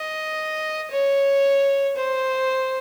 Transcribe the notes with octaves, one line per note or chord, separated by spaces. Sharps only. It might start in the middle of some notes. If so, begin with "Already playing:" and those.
Already playing: D#5
C#5
C5